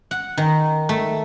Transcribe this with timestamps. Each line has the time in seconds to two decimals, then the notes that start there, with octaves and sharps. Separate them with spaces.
0.11 F#5
0.38 D#3
0.89 A3